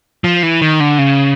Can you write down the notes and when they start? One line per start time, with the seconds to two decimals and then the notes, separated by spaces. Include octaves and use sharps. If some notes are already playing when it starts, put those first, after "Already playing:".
0.24 F3
0.43 E3
0.61 D#3
0.80 D3
0.98 C#3